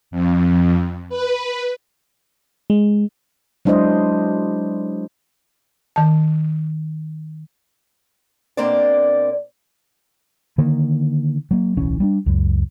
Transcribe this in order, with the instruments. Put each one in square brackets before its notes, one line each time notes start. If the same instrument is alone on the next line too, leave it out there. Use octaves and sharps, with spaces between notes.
[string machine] F2
B4
[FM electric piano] G#3
[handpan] F#3 G#3 D4 E4 C5 D#5
[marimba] D#3 A5
[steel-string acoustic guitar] B2 A#3 C4 D4 C5 D5
[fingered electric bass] D3 D#3 A#3
F#3 A#3
D1 B1 E3 C#4
G3 A#3 D4
C#2 F#2